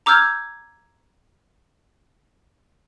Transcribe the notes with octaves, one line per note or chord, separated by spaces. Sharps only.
A#5 D6 E6 F6 G6 G#6